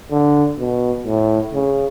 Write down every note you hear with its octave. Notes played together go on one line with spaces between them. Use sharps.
D3
B2
A2
C#3